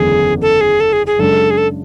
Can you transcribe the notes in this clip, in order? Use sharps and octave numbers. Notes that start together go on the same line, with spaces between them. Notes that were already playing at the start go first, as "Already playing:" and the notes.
Already playing: F#1 E2 D3 G#3 C#4 G#4
A4
G#4
A4
G#4
G#4
F#2 C#3 G#3 D4 A4
G#4
A4